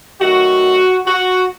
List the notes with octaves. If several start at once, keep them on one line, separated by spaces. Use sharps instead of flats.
D#3 F#3 A3 F#4
F#4